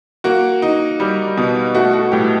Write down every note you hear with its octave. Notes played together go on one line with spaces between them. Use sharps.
A#3 F#4
D#4
G3
B2
A3 F#4
F#4
A2 G4